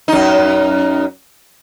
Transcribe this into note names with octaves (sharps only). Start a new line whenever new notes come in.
F#2 D#4